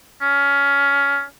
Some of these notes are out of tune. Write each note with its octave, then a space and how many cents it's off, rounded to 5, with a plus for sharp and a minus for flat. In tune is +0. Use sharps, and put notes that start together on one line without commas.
C#4 +20